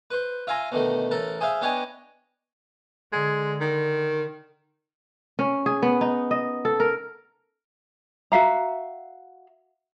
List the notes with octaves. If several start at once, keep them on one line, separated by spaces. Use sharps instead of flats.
B4 C5
F4 E5 F5 G#5 A#5 C6
B2 D3 D#3 A3
A1 A4 A#4 A5
G#4 C5 E5 F5
B3 D4 G4 C#5 D#5 G#5
D3 G#3
D#3
C#4
G#4
B3
D#4
D#5
A4
A#4
F#4 E5 F5 A#5